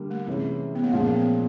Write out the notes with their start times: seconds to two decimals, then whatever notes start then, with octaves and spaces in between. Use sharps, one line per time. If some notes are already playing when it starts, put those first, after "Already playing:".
Already playing: D3 G3 A#3
0.11 A3
0.27 C3 E3 G#3 C#4
0.75 B3
0.84 A#3
0.92 A#2 F3 G#3 A3 C#4
1.15 B3